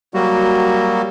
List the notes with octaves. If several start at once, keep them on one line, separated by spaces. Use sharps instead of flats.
F#3 G3 A#3 F#4